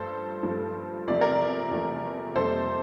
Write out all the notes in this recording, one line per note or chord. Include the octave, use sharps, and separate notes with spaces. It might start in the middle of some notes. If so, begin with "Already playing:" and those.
Already playing: G2 F3 A3 A4 C5
G2 F3 A3
E2 C3 F3 A3 D5
A#4 D5
E2 C3 F3 A3
F2 C3 G3 A#3 A4 C5